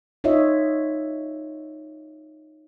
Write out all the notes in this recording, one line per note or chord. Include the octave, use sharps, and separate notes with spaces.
D#4 F4 C#5 D#5 E5